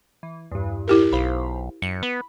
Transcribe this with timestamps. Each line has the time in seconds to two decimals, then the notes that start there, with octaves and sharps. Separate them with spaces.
0.23 E3
0.52 E2 G2
0.88 E4 G4 A#4
1.13 B1 C5 F5 B5
1.82 F#2 C#7
2.03 B3 B5